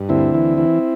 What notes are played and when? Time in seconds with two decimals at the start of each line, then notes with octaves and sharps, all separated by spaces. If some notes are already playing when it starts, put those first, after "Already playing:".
Already playing: G2
0.09 D2 C4 E4
0.34 E3
0.58 E3